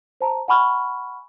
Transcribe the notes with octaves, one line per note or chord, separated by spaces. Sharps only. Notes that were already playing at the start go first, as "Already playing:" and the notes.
C5 A5 A#5
F#5 G#5 B5 C#6 F6